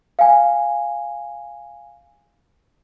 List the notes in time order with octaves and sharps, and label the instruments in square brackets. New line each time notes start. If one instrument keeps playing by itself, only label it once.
[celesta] F5 G#5